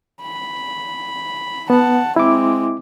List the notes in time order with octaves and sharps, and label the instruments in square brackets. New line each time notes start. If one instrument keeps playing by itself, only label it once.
[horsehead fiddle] B5
[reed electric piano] B3 [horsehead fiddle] F#5 A5
[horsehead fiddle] G#3 C4 [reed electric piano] E4 D6